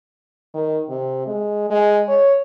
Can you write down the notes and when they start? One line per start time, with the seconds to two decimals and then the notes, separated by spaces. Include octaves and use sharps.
0.54 D#3
0.89 C3
1.27 G#3
1.70 G#3
2.08 C#5